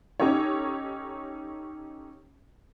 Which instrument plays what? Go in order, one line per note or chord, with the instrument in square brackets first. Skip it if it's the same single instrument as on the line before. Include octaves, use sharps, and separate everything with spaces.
[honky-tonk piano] C#4 D#4 G4 A4 C#5